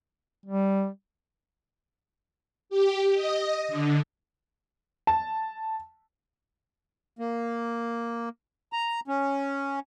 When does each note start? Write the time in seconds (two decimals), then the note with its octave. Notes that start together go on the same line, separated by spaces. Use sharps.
0.46 G3
2.70 G4
3.13 D#5
3.68 D3
5.07 A5
7.19 A#3
8.73 A#5
9.08 C#4